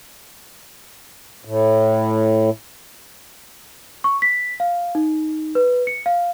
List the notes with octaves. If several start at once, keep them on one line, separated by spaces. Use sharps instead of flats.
A2
C#6
B6
F5
D#4
B4
C#7
F5